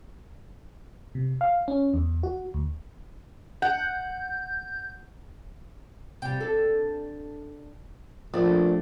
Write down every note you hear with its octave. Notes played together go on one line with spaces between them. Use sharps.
C3
F5
C#4
E2
F#4
D2
F#5 G6
C3 G3 G5
D4 A4
A#1 A3 D4